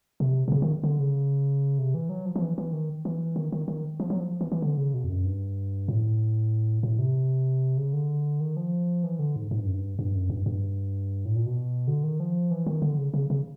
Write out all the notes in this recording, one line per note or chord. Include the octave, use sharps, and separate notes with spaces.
C3
C3
C#3
D#3
D3
C#3
C3
E3
F#3
F3
F3
E3
E3
D#3
E3
D#3
D#3
D#3
F3
F#3
F3
E3
E3
D3
C#3
B2
F2
F#2
G2
A2
A2
C3
C#3
D3
D#3
F3
E3
D3
G#2
G#2
G2
F#2
G2
G2
F#2
G2
G2
A2
A#2
B2
D3
D#3
F3
E3
D#3
D3
C#3
C#3
C#3